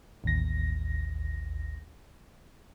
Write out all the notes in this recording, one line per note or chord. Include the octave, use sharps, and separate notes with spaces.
A1 D#2 A#6